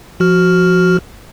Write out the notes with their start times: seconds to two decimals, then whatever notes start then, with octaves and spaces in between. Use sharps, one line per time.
0.20 F3 F#4 F6